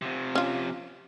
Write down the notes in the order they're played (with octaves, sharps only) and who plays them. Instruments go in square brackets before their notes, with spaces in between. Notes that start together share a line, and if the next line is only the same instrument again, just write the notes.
[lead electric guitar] C3 F3
[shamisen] C#4 F4